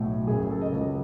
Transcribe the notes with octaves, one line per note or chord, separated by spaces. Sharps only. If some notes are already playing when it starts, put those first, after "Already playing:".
Already playing: B1 A2 F#3
F#1 F#2 C#3 G#4
A4
D#5
C#2 C#3 F#3